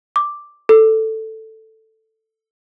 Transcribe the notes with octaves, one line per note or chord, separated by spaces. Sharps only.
D6
A4